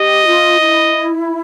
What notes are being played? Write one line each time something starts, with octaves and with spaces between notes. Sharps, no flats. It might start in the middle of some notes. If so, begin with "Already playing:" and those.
Already playing: G4 D#5
F4
E4